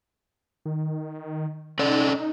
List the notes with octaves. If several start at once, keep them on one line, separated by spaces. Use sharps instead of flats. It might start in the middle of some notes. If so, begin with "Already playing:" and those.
D#3
C#4 D#4 A4 D5